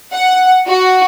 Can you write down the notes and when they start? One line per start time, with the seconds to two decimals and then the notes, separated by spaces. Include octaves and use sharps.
0.12 F#5
0.68 F#4